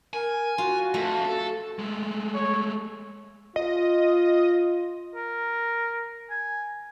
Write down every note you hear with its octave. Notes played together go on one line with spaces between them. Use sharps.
A#4 G#5
F4 F#4
F2 A3
A4
G#3 A3
C#5
F4 D#5
A#4
G#5